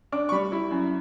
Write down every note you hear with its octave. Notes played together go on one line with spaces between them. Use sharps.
D4 D6
C#6
G3 B5
E4
F#2